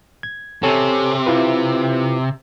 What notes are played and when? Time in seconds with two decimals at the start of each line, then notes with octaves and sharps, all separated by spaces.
0.23 G#6
0.63 C3 A4 C#5 G#5
1.26 E4 F4 B4